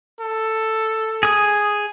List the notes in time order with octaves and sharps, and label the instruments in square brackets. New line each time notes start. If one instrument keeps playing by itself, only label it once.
[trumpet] A4
[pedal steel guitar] G#4 D#6